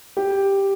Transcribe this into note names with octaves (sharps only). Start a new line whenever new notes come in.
G4